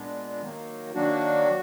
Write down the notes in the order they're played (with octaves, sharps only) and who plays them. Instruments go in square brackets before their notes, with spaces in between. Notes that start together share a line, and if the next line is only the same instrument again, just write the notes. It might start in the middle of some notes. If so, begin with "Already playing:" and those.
Already playing: [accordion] A#2 G#3 B3 D4
D#3 F#3 A#3
D#3 F#3 A#3 D4 F#4